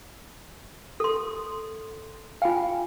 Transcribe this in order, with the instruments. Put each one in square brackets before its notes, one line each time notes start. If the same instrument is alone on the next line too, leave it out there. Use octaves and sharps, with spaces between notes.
[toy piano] A4 C6
[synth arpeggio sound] F4 F5 [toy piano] G5 G#5 B5